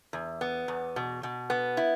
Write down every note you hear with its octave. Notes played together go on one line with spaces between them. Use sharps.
E2
B3
E2
B2
B2
B3
E4